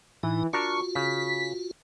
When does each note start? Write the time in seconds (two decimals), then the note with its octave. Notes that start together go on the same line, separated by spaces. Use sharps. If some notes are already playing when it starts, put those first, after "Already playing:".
0.23 A2 E3 D#4
0.53 D4 F4 F#4 A#4 C#6
0.95 C#3 B6